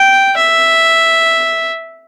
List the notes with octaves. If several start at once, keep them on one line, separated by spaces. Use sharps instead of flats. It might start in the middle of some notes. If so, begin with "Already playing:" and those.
Already playing: G5
E5